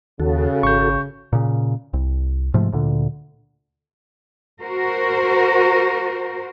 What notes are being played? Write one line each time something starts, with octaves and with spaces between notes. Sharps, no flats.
D#2 C#3 F#4 A4
G#1 C#6 G6
A#2 C#3
C2
G#2 C3 F3 A3
D2 A#2 D3
F#4 A#4 C5